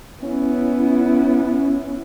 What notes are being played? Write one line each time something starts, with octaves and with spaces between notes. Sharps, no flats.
B3 C#4 E4